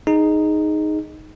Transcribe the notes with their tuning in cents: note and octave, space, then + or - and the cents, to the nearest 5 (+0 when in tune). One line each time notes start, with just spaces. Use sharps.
D#4 -5 G#4 +0